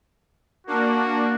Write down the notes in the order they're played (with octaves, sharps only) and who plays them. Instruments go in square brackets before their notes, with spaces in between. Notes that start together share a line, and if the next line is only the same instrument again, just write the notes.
[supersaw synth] A#3 D4 [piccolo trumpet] F#4